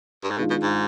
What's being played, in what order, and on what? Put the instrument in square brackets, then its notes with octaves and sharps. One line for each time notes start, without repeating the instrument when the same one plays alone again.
[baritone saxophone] G2
G#2
[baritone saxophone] B2 [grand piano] D#3 G#3 D4 F4
[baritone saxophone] B2
G#2